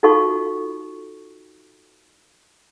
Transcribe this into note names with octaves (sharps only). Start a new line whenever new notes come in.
D#4 F4 F#4 A4 F5 C#6